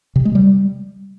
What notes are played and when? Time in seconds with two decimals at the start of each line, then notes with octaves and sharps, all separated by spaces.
0.16 C3
0.25 G#3
0.35 G3